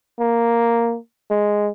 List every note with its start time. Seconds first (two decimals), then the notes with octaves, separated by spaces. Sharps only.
0.19 A#3
1.31 G#3